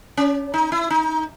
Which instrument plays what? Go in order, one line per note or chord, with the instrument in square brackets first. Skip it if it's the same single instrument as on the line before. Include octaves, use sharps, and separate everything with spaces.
[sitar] C#4
D#4
E4
D#4